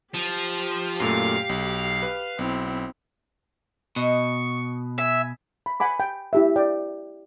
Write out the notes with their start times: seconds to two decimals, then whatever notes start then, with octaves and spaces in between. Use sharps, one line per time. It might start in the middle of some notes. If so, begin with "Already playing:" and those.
0.14 F3 G4
1.00 F#2 A#2 A3 F5
1.49 B1
2.02 B4
2.39 B1 C4 E4
3.96 B2 D#5 C#6
4.98 E5 G#5
5.66 B5
5.80 F#5 G#5 B5 D6
6.00 G5
6.33 E4 G4 E5
6.56 D5 G5